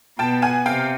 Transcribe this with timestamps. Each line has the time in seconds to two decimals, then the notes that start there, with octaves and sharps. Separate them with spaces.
0.18 B2 G5 A5
0.42 F#5 G#5
0.66 C3 F5 G5